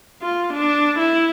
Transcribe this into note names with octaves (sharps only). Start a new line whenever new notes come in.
F4
D4
E4